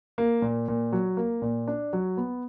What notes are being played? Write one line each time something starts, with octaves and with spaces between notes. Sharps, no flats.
A#3
A#2
A#2
F#3
A#3
A#2
D4
F#3
B3